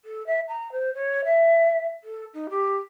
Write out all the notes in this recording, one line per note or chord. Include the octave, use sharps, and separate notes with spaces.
A4
E5
A#5
C5
C#5
E5
A4
D#4
G4